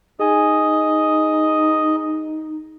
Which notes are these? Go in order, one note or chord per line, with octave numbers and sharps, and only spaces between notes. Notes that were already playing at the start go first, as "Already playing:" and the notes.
D#4 G#4 D#5 G#5